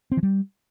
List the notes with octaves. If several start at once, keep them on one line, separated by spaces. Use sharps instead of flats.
C4
E3
G3